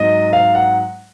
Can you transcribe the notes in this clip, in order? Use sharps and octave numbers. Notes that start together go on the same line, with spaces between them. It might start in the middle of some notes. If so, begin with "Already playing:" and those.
Already playing: G#2 F#3 C4 D#5
F5
F#5